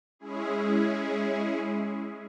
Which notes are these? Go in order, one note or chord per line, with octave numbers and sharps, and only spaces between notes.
G#3 C#4 E4 G#4